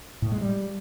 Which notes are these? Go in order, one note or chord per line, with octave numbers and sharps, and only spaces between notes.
A2
G#3
G3